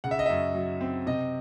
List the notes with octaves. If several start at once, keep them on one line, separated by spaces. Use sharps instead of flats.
C#3 F#5
E5
D#5
F#2 E5
F#3
C4
C3 D#5